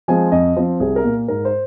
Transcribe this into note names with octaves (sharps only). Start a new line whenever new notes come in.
F3 G#3 C4 G#5
F2 D#5
F3 C4 C5
C2 G#4
A#4
A#2 A#3
G#2 A#4
C5